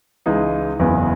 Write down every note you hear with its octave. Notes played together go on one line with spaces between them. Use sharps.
C#2 C#3 E3 G#3 D#4
F#1 E2 C#3 E3 B3